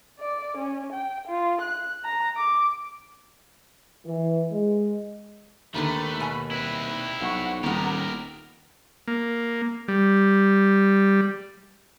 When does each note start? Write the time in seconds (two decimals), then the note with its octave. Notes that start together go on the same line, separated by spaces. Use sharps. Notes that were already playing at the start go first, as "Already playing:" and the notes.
0.20 D5
0.57 C#4
0.93 G5
1.27 F4
1.61 F#6
2.04 A#5
2.36 D6
4.05 E3
4.51 G#3
5.74 D#2 A#2 D3 D#3 A3 B4 B5
6.20 B2 G#5
6.51 C4 E4 B4
7.20 B1 F#5 C#6
7.63 D#1 A2 D#3 B3 G4 A#4 A#5
9.08 A#3
9.88 G3